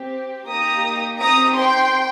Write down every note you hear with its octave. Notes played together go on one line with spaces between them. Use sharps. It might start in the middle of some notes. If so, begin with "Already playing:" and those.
Already playing: C4 G4
A#3 D#4 G4 A#5 D#6
C4 D#4 G4 A#5 D#6
G5 C6